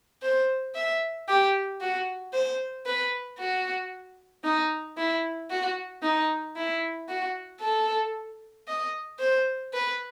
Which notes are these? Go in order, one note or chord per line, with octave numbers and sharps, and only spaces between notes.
C5
E5
G4
F#4
C5
B4
F#4
D#4
E4
F#4
D#4
E4
F#4
A4
D#5
C5
B4